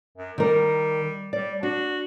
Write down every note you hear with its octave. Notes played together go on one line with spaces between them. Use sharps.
F#2
D#3 G3 A#4
G3 D5
D4 F#4